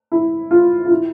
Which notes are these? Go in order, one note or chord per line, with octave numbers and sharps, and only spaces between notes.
E4
F4
F4
E4